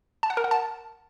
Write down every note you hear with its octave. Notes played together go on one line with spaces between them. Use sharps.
A5
F#5
A#4
F#5
A5